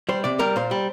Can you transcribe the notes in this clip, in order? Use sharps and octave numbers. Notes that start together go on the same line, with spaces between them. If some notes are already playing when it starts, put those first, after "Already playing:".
G3 C5
C3 D5
G3 A#4
A#2 C5
G3